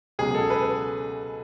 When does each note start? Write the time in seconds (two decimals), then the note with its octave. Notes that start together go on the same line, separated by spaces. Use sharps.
0.19 C#2 B2 F#3 G#4
0.35 A4
0.50 B4